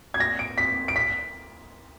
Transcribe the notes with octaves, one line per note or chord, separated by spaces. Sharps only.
G#6
A#6
D7
B6
D7
B6